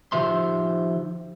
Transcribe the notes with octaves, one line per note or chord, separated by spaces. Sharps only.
D#3 F3 G4 C5 E5 C6